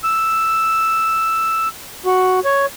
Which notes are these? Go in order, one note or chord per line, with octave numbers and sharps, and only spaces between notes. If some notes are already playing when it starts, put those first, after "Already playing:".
E6
F#4
C#5